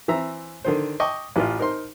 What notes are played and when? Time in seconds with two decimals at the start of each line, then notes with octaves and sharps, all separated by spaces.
0.08 E3 C4 E5 A#5
0.64 D3 D#3 C5
1.00 D#5 G5 C#6 D6
1.36 A1 E3 F4
1.59 D#4 A#4 C5 C6